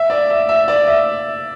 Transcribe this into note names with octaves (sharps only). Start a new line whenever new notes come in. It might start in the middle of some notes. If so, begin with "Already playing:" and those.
Already playing: E5
D5
E5
E5
D5
E5